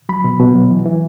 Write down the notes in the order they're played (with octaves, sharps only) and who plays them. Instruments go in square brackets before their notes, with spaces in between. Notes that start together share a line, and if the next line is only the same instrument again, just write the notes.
[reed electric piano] F#3 B5
B2
B2
F#3
E3
E3